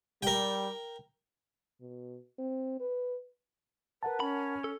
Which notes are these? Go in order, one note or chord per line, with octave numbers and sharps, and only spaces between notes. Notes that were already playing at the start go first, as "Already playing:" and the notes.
G3 A#4 G5
B2
C4
B4
A#4 B4 F#5 A5
C#4 B5
A4